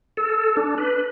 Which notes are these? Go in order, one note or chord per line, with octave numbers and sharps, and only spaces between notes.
A4
D4
B4